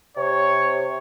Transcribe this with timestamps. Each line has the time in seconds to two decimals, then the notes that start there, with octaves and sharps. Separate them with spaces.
0.17 C3 C#5